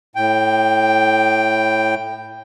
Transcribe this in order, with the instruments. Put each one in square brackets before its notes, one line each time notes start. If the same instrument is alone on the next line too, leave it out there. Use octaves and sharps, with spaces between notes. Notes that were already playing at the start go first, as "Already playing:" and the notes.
[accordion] A2 G5